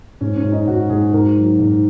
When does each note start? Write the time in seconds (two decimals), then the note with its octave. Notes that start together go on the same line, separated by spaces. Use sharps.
0.21 G#2 C#4
0.37 C#4
0.44 G#2
0.52 D#4
0.67 G#2 F#4
0.90 G#2 G#4
1.13 G#2 A#4
1.37 F#3
1.59 G#2